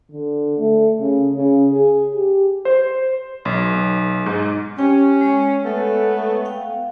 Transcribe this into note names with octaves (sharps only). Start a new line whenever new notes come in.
D3
A3
C#3
C#3
G#4
G4
C5
B1
G#2
C#4 G4 G5
G#3 C#5
A3 B3
F5 G5